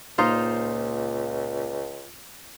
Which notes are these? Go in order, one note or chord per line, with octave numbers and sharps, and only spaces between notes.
C#2 A#2 D#4 F4 C5